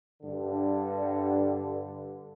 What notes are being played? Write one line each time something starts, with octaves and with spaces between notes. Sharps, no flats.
G2 D3